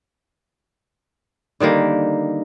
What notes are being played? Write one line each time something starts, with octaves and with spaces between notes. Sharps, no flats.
D3 D#3 G3 A#3